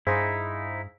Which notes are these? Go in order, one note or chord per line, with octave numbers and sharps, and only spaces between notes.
G2 D#4 E4 G#4 C5 F5